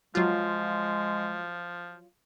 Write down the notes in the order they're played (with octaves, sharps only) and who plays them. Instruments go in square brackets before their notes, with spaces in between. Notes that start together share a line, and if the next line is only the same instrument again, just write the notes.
[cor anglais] F3 [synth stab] F#3 F4 [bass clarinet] G#3